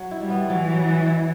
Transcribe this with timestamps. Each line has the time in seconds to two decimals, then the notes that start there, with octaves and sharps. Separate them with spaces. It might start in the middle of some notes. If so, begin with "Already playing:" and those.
Already playing: F#3
0.11 E4
0.21 G3
0.30 B3
0.50 E3 F#3
0.69 F#3
0.87 B4
1.06 E4